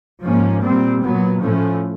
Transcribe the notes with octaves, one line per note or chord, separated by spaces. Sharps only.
G#2 F3 A#3 C#4
A#2 G3 C4
A#2 F#3 B3
A2 F3 A3 C#4